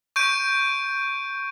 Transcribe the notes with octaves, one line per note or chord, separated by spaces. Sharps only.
C#6 G6 D7 D#7